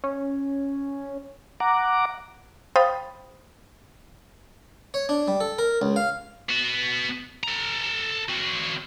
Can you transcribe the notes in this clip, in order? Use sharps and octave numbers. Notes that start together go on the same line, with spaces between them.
C#4
F#5 A#5 D6
C5 F5 G5 B5 D#6 A6
C#5
D4
G3
A4
A#4
C#2
F5
B3 F#4
A4 A#5
C4 F#4